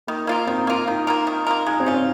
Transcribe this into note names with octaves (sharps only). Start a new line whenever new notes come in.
D#3 A#3
A#3 F4 A#4
D#3 C4
A#3 F4 A#4
D#3 D#4
A#3 F4 A#4
D#3
A#3 F4 A#4
G#3 D#4
C4
C#4 F4
C4